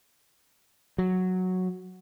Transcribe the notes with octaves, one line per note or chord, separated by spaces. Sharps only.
F#3